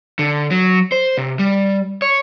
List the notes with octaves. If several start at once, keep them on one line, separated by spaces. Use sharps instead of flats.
D3
F#3
C5
C3
G3
C#5